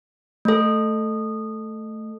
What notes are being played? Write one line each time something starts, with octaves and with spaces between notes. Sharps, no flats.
A3 A4